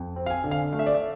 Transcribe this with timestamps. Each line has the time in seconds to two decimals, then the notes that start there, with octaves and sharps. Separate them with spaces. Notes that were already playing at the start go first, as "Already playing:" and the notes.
Already playing: F2
0.16 C4
0.26 F5
0.30 G#5
0.44 D3
0.51 F5
0.73 A3 F5
0.79 E5
0.86 D5
0.94 E5